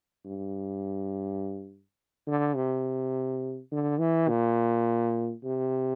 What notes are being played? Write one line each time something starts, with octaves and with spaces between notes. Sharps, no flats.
G2
D3
C3
D3
E3
A#2
C3